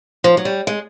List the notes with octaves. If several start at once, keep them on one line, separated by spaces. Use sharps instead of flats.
F3
F#3
G3
G#3